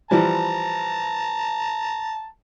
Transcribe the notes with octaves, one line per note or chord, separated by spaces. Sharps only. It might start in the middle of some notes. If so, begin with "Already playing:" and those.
E3 F3 G3 A5 A#5